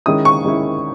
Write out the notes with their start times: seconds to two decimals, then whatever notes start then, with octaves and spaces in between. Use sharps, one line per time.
0.06 D#3 G#3 C#4 E4 D#6
0.25 C#6
0.44 D#3 G#3 C#4 E4